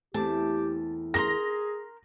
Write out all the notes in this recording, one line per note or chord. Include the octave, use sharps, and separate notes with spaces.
E2 A3 C4 G4 A5
G#4 A#4 A#5 C6 A#6